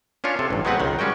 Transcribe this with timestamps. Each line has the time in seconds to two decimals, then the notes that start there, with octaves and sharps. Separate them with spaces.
0.24 C#4 D4 F4 C#5
0.39 C3 A4
0.50 A1 G2
0.65 F#3 G#3 B3 C4 B4 F#5
0.80 C#2 D#3
0.99 G3 G#3 C#4 F#4 G5